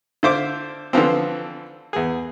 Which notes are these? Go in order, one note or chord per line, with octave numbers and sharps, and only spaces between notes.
D3 F4 C5 E5 D6
D3 E3 F3 C4
E2 G#4